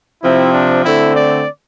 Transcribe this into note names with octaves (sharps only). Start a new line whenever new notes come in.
C3 F3 C4 E4
D4
D3 A3 C4 E4
D5